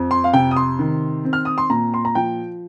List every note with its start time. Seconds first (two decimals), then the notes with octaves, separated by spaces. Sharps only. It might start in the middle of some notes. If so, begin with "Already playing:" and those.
Already playing: F2
0.11 C6
0.24 F5
0.33 C3 G5
0.51 D#6
0.56 C6
0.79 D#3
1.25 C4
1.33 F6
1.45 D#6
1.58 C6
1.70 A#2 A#5
1.94 C6
2.05 A#5
2.15 F3 G5